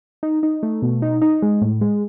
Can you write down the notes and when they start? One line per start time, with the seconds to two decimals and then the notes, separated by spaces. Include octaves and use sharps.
0.23 D#4
0.43 D#4
0.63 A3
0.82 B2
1.02 D#4
1.22 D#4
1.42 G#3
1.61 A2
1.81 G#3